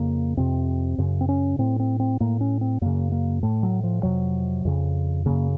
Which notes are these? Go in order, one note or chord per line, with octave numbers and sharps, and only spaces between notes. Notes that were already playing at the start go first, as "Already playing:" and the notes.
Already playing: F2 C#3 A#3
F2 C3 C4
F#2 C#3
C4
C#4
A2 C4
C4
C4
A2 A#3
C#4
C4
F#2 C#3 A#3
A#3
A2 A3
F#3
F3
F2 C3 F#3
F2 C#3
F#2 C#3 A#3